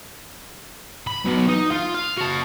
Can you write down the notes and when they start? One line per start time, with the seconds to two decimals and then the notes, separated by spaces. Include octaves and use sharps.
1.07 B5
1.25 F#3 B3
1.48 D#4
1.71 F4
1.95 F5
2.17 F#4 A5